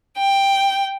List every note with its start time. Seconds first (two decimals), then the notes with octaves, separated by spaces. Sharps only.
0.17 G5